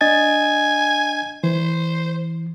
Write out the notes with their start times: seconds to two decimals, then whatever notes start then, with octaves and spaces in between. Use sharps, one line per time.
0.01 D4 D#5 G#5 A6
1.44 E3 C5